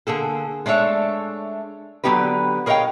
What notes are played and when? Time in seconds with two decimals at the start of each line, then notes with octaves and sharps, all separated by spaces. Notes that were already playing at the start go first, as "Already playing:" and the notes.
0.07 D3 A#3 G#4 A4
0.66 G#3 A3 D4 C#5 E5
2.04 D3 F#3 B3 D#4 G4 B4
2.66 G#4 A#4 C#5 D#5 F5 G5